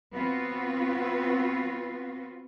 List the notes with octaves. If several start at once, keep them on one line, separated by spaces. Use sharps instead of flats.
B3 C4 F4 F#4 B4